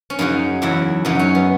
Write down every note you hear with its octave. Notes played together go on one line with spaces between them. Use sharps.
C#4
F#2 C#3 F#3 D#4
E2 C#3 F#3 E4
F#2 C#3 F#3 D#4
C#4
B3